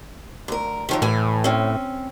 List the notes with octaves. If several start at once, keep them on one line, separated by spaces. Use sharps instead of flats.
D2 A#4
D#3 F3 F#3
A2 E3 G#5
C4 C#4